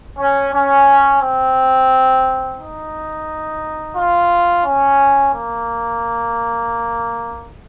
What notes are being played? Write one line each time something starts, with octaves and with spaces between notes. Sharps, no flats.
C#4
C#4
C4
D#4
F4
C#4
A#3